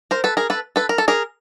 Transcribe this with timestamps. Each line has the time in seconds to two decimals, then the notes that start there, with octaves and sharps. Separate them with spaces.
0.11 A#4 C5
0.24 A4 B4
0.37 G#4 A#4
0.50 A4 B4
0.76 A4 B4
0.89 A#4
0.98 A4
1.08 G#4 A#4